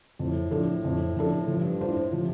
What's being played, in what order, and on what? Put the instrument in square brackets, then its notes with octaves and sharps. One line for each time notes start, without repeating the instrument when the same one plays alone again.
[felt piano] F2 [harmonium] A2
[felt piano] F3 D4 A4
F2
F3 D4 A4
[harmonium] G2 [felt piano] F3
[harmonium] A2 [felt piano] D4 F4 C5
[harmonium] C3 [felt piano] F3